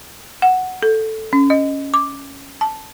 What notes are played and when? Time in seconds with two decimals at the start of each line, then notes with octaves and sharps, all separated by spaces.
0.42 F#5
0.83 A4
1.33 C#4
1.50 D#5
1.94 D6
2.61 A5